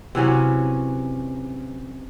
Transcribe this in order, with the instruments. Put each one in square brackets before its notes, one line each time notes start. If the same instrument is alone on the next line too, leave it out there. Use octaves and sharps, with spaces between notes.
[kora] C3 E3 F#3 C#4